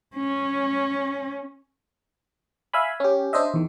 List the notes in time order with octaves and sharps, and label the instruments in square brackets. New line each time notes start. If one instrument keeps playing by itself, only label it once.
[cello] C#4
[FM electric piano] E5 F5 G#5 B5
C#4 G4
D4 C5 D#5 E5
E2 D#3